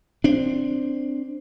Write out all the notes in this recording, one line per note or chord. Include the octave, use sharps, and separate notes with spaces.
C4 D4